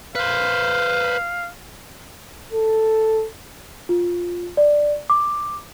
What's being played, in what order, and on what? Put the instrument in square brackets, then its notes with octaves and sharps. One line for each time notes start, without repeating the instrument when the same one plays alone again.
[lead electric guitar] B4 C5 [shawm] F5
[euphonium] A4
[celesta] F4
D5
D6